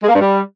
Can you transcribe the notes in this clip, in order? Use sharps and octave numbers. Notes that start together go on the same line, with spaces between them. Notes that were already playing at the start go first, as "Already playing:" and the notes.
G#3
A#3
G2
G3